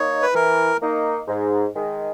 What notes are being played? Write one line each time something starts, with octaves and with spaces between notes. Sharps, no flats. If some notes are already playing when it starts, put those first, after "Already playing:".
Already playing: A#3 D#4 C#5
B4
E3 A#4
A#3 D#4
G#2
D#3 G#3